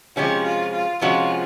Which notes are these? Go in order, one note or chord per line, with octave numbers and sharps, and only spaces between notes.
C3 F3 G#3 C#4 F#4 G4
F4
F4
C3 F3 G#3 C#4 F4 F#4